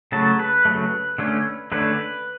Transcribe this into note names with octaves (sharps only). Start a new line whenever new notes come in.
C#3 F#3 A3 A5
B4
C#3 F#3 A3
D3 A3 C#4
D3 A3 C#4 B4